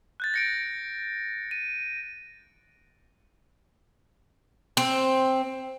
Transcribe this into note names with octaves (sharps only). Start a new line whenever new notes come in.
F#6 G6 A6
A#6 C#7 D7
D#7
C4